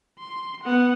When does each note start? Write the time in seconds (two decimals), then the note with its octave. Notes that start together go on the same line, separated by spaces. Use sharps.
0.19 C6
0.63 B3 F#5